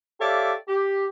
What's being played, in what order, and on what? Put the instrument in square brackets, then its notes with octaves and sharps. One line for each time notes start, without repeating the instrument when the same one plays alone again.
[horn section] G4 A4 C#5 D5 E5 F5
G4